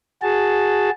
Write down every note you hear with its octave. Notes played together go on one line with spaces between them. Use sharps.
F#4 G#4 A5